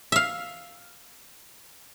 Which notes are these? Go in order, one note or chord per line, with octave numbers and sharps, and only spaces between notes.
E5 F5